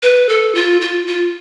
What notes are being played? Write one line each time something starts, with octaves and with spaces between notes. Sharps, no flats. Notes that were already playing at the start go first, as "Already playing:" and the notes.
B4
A4
F4
F4
F4